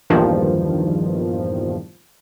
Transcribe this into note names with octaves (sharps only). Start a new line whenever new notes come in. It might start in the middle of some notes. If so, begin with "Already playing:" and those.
A#1 E2 G2 D#3 F3